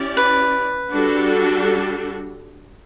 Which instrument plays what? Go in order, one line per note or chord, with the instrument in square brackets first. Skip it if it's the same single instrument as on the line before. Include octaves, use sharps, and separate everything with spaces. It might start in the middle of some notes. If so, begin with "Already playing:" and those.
Already playing: [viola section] C#4 E4 G4 D5
[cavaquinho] B4
[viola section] G3 D4 F#4 A4